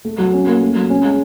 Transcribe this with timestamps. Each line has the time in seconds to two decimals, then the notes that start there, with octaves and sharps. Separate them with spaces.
0.05 A3
0.18 F#3
0.33 C#4
0.47 A#3
0.61 A3
0.75 F#3
0.90 C#4
1.04 G#3